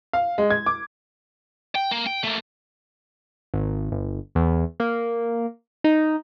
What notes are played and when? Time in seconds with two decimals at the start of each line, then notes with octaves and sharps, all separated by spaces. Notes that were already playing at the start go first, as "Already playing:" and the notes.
0.13 F5
0.38 G#3
0.50 G#6
0.66 D6
1.75 G5
1.92 A#3
2.07 G5
2.24 A3 A#3
3.54 G#1
3.92 G1
4.35 E2
4.80 A#3
5.84 D#4